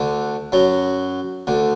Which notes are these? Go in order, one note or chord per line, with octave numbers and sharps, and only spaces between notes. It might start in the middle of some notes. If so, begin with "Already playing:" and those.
Already playing: D2 D3
F#2 F#3
D2 D3